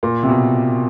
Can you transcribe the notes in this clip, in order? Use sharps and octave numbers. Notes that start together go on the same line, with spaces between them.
A#2
C3
B2